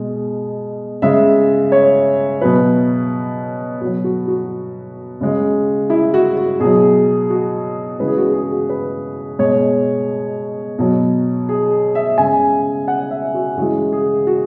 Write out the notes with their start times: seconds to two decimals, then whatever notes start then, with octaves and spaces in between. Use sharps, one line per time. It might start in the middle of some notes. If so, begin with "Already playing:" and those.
Already playing: B2 G#3
1.02 C#3 G#3 E5
1.72 C#5
2.41 B2 F#3 B4
3.81 B2 F#3 F#4
4.04 F#4
4.28 F#4
5.21 C#3 G#3
5.90 E4
6.14 F#4
6.37 F#4
6.60 B2 F#3 G#4
7.30 F#4
8.00 C#3 E3 G#3 B4
8.08 G#4
8.17 F#4
8.34 G#4
8.52 F#4
8.69 B4
9.39 B2 G#3 C#5
10.78 B2 F#3
11.49 G#4
11.95 E5
12.18 C#3 G#3 G#5
12.88 F#5
13.11 E5
13.34 F#4
13.57 C#3 E3 G#3 F#4
13.92 G#4
14.27 F#4